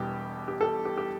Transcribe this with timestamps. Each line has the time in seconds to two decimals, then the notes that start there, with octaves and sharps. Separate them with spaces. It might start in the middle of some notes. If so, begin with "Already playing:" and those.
Already playing: E1 E2 B2 G3 G4
0.48 G4
0.61 A4
0.85 G4
0.98 G4